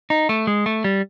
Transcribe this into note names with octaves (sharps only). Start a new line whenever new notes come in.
D#4
A3
G#3
A3
G3